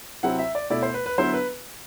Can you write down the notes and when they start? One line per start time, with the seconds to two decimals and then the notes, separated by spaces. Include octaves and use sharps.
0.23 C3 F#3 C4 E4 F#5
0.39 E5
0.55 D5
0.70 B2 A3 E4 D5
0.82 C5
0.94 B4
1.06 B4
1.18 D3 F#3 B3 E4 C5
1.34 B4